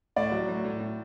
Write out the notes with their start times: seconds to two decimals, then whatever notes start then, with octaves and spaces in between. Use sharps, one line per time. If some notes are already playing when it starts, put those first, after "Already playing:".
0.16 A2 D5
0.32 F#3
0.48 A2
0.65 A2
0.80 A2